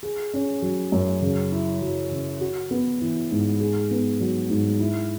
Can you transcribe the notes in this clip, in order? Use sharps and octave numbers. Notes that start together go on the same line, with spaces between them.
G#4
C#4
F#3
F#2
C#3
E4
F#3
C#3
F#4
B3
E3
G#2
G#4
B3
F#3
G#2
E4